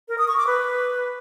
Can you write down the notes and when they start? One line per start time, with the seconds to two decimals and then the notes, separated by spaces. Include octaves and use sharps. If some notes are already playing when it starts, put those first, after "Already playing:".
0.09 A#4
0.18 D#6
0.28 C#6
0.37 D6
0.47 B4